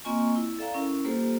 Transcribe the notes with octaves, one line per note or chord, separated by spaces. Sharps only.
A#3 C4 F4 D#5 G#5 C#6
E4
A4 D5 E5 F5 G5 A#5
C#4 E4 A#4
G3 A#3 F4 G4 A4 C5